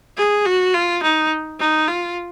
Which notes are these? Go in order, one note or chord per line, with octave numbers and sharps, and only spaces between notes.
G#4
F#4
F4
D#4
D#4
F4